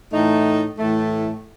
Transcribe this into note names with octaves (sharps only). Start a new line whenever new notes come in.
A2 E3 A3 D#4
A2 E3 A3